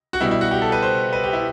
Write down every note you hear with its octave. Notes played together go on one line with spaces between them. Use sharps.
F#4
B2 G3 E4
E4
F#4
G4
A4
B4
C5
B4
G4
E4